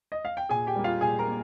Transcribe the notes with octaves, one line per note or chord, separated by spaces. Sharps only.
D#5
F5
G5
A#2 G#4 G#5
G4 G5
G3 A#3
F4 F5
A#2 G#4 G#5
A#4 A#5
A#3